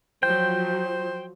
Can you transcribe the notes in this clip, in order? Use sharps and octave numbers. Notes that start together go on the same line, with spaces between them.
F3 F#3 C5 G5